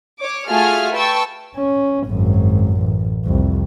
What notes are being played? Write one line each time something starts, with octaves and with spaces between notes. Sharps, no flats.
C#5 D6
A3 F4 F#4 G#4 G#5 F6
B4 G5 A5 C#6 E6
C#4
G#1 F#2
A1
C2 F2